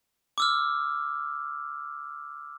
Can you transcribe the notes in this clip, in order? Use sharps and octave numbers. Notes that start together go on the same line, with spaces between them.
D6 E6 F6